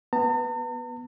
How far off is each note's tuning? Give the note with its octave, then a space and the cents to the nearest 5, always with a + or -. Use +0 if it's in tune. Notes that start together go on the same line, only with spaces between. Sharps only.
B3 -5 A#5 -45